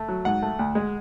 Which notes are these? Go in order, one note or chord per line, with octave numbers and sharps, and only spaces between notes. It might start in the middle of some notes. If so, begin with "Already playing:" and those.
Already playing: A3
F#3
G#2 F#5
A3
D2
G#3